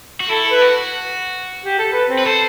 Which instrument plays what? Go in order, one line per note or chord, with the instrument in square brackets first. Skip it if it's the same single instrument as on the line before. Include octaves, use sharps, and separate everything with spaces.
[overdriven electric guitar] F#4
[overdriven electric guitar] E4 [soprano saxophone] A4
[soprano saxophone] B4
[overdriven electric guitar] F#4
[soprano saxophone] G4
A4
B4
C4
[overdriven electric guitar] B4
[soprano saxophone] A4 [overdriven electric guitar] C5